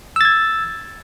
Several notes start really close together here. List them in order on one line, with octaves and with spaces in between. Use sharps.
E6 A6 G#6